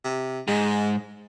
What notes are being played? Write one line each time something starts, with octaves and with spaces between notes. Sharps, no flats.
C3
G#2 G#3